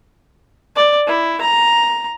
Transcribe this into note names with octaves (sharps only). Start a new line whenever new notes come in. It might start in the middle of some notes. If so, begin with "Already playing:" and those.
D5
E4
A#5